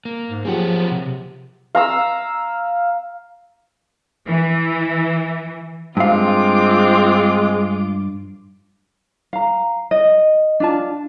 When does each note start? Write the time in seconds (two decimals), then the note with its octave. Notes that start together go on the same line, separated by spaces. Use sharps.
0.05 A#3
0.29 G#2
0.45 F3 F#3 A#3 C4 G4 G#4 F#5
0.91 C3
1.75 F5 A#5 E6
4.27 E3
5.97 G2 G#3 C4 F4 F5 D6
9.33 F5 A#5
9.91 D#5
10.60 D4 F4 A5